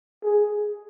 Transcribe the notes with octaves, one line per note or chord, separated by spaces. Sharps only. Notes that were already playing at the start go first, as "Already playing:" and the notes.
G#4